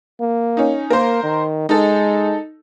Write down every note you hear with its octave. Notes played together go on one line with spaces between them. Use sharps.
A#3
C#4 D#4
A#3 A#4 C5
D#3
G#3 D#4 A4